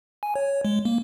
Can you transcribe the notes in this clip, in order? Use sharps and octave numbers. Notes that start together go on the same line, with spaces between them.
G#5
C#5
G#3
A#3